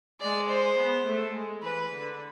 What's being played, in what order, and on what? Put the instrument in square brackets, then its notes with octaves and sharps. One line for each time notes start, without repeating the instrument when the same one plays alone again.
[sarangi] G#3 [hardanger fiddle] D5
[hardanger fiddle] C5
[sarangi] B3
A3
G#3
[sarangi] E3 [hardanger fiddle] B4
[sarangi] D3